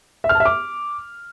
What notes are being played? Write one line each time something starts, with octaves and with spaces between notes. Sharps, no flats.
E5
F6
A5
E5
D6